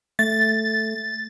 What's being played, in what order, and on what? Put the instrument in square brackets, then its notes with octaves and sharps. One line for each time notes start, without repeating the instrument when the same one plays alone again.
[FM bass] A3 [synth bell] A6